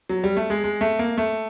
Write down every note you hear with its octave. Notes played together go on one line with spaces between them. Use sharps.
F#3
G3
A3
G#3
G#3
A3
A#3
A3